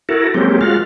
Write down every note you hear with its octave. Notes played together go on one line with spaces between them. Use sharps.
E4 F#4 A4 A#4
F#3 G#3 A#3 C4 C#4 G4
G#3 F4 F#4 F5